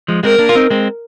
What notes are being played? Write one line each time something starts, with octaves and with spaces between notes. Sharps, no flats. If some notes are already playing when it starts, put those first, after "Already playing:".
F3 G#3
G#3 C4 A#4
A#3 D4
F4
C4 D#4
G#3 C4